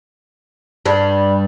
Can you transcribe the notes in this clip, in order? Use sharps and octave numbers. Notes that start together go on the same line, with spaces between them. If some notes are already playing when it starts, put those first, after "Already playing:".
G2 G3